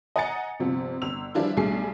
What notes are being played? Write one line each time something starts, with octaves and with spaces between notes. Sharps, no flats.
D#5 F#5 G#5 A#5 A6 C#7
G1 C3 F3
G1 E6 F7
E3 F3 G3 D4 E4 F4
B1 G3 A3 D4 G#4 C7